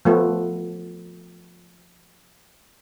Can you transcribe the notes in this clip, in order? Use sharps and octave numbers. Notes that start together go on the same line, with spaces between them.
F3 A3 B3